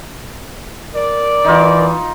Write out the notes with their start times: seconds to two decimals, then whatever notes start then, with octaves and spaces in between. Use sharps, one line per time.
0.95 A#4 D5
1.45 E3 D#4 F4